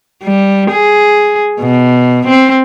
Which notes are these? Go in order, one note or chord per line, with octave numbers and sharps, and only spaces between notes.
G3
G#4
B2
C4